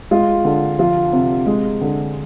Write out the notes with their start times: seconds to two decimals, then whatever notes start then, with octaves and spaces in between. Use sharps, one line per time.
0.11 G#3 F4
0.45 D3
0.79 F3 F4
1.13 C3
1.47 G#3
1.81 D3